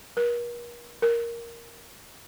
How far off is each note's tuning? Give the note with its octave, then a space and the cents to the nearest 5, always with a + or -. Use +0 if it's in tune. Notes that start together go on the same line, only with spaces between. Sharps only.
A#4 +45
A#4 +5